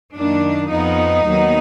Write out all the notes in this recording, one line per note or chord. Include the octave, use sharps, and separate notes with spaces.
F#2 D#3 A#3 D4
F2 F3 B3 D#4
D#2 D#3 F#3 B3